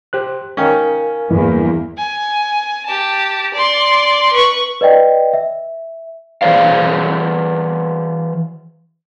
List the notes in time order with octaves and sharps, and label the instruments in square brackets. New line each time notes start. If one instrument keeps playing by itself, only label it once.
[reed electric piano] G4 C5 F#6
[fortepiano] D#3 C#4 [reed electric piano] A#4 F5 G#5
[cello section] E2 G2 A#3 [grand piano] E3
[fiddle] G#5
G4 A5
D5 C6
B4 C#6
[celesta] B4 D5 D#5 G5
E5
[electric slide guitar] E3 G#4 C5 D5 F5